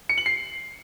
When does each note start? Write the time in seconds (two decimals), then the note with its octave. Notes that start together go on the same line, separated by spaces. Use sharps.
0.09 C#7
0.18 F#7
0.26 C7